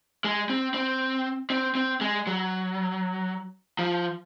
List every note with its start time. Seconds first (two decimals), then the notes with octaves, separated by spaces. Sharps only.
0.24 G#3
0.49 C4
0.74 C4
1.50 C4
1.75 C4
2.01 G#3
2.27 F#3
3.79 F3